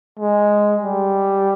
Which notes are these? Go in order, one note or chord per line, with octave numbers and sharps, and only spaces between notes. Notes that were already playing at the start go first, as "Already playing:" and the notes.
G#3
G3